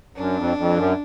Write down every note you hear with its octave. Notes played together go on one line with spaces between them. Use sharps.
F#2 D4
F2
F2
F#2